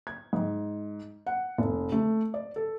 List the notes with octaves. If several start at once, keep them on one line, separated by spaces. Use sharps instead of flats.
G#6
G#2
F#5
F1
A3
D5
A4